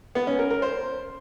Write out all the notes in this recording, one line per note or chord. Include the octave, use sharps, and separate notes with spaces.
B3
C#4
A#4
A#4
C5